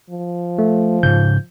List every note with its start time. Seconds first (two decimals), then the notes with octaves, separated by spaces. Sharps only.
0.10 F3
0.59 A3
1.03 G#2 C#3 G6